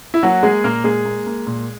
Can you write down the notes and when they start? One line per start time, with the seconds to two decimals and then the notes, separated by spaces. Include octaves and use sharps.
0.14 E4
0.23 F#3 A#3 F#4
0.43 G#3 A#3 G#4
0.63 A#2 A#3 A#4
0.84 A#2 G#3 G#4
1.05 A#3
1.26 A#3
1.47 A#2